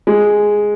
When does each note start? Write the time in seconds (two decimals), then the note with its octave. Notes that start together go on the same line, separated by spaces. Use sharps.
0.07 G#3